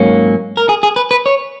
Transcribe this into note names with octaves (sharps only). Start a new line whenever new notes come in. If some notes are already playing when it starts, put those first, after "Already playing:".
Already playing: G#2 F#3 A#3 C#4
A#4
G#4
G#4
B4
B4
C#5